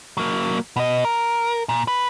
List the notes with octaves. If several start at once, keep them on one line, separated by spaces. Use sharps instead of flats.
F#3 A#3
B2 D#5
A#4
A#2
B4